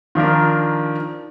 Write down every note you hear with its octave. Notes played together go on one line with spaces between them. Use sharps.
D#3 F3 D4 A#4